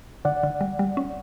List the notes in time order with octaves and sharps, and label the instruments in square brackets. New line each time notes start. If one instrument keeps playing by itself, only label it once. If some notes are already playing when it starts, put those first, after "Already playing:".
[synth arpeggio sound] D3 [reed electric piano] D5 F#5
[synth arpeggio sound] D3
G3
G3
C#4